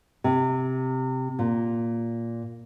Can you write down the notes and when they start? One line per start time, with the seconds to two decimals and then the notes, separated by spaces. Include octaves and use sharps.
0.24 C3
1.39 A#2